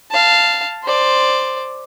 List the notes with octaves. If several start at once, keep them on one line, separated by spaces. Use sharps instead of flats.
F5 A5
C5 D5